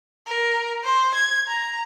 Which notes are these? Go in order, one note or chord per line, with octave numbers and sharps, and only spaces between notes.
A#4
C5
G#6
A#5